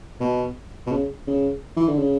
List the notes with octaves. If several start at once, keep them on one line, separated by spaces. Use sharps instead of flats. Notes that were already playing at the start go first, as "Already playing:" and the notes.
B2
B2
C#3
C#3
E3
D3
C#3